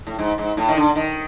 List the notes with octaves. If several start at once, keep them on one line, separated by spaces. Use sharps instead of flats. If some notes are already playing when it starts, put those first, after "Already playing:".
A2
G#2
G#2
A2
D#3
D3
D#3